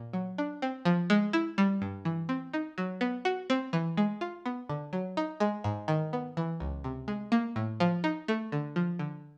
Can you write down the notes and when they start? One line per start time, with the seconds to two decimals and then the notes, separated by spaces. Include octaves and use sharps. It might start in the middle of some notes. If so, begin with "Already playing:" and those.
Already playing: A#2
0.13 F#3
0.38 D4
0.62 C4
0.85 F3
1.10 G#3
1.33 E4
1.58 G3
1.82 G2
2.05 E3
2.29 C4
2.53 D#4
2.78 F#3
3.01 B3
3.25 F#4
3.50 C4
3.73 E3
3.97 G#3
4.21 F4
4.46 B3
4.70 D3
4.93 F#3
5.17 D#4
5.40 G#3
5.64 G#2
5.88 D#3
6.13 B3
6.37 E3
6.60 C#2
6.84 C3
7.08 G#3
7.32 A#3
7.56 A2
7.80 F3
8.04 D#4
8.28 A3
8.52 D3
8.76 F3
8.99 D3